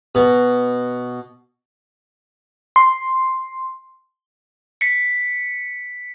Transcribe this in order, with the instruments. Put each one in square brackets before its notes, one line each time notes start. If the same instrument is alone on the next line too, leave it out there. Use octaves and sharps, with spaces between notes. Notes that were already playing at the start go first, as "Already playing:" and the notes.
[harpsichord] B2
[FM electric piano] C6
[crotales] B6 C#7